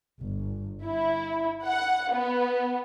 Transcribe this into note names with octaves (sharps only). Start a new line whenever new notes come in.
G1
E4
F#5
B3